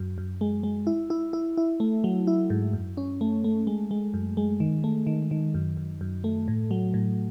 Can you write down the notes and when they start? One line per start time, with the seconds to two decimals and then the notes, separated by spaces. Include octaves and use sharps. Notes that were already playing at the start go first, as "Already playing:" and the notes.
Already playing: F#2
0.18 F#2
0.41 G#3
0.63 G#3
0.87 E4
1.10 E4
1.33 E4
1.57 E4
1.80 A3
2.04 F#3
2.27 E4
2.50 G#2
2.73 F#2
2.97 C#4
3.21 A3
3.44 A3
3.67 G#3
3.91 G#3
4.14 F#2
4.37 G#3
4.60 D#3
4.84 A3
5.07 D#3
5.31 D#3
5.54 F#2
5.77 F#2
6.01 F#2
6.24 A3
6.48 A2
6.71 F#3
6.94 A2